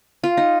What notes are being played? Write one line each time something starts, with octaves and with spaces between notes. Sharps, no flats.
F4
D#4